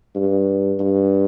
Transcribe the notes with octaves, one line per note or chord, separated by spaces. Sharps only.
G2
G2